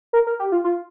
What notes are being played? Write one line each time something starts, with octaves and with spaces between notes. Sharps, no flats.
A#4
A#4
G4
F4
F4